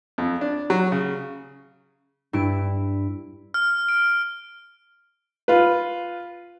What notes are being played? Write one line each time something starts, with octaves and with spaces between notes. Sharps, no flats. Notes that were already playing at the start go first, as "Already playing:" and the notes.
F2
D4
F#3
C#3
G2 E4 D7
F6
D7
F4 B4